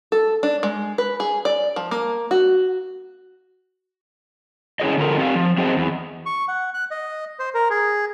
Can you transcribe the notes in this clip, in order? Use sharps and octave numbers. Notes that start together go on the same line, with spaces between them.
A4
D4
G#3
B4
G#4
D5
F3
A#3
F#4
C#4 E4 F4 G#4 C#5 D#5
D3 F#3 F4 A4 A#4
C4 G4 F5
F3
F#3 C4 G#4 C5 D#5
E2
C#6
F#5
F#6
D#5
C5
A#4
G#4